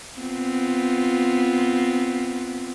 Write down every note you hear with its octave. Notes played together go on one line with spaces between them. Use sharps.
B3 C4 F4